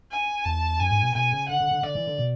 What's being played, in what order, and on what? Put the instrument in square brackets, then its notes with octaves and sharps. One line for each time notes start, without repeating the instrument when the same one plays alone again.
[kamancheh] G#5
[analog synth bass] E2 [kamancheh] A5
[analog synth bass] F#2 [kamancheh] G#5
[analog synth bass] G#2
B2
[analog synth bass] B2 [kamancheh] G#5
[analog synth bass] C#3
[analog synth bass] D3 [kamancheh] F#5
[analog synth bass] D3
D3
[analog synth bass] D3 [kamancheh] D5
[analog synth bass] E3
D3
B2